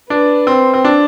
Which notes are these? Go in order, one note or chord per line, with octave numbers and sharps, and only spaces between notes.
D4 B4
C4
C4
D4